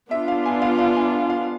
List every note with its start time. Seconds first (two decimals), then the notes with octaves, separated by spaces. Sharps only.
0.11 B3 D4 F4 E5
0.28 F5
0.46 G#5
0.62 F5
0.79 F5
0.96 G#5
1.13 F5
1.30 F5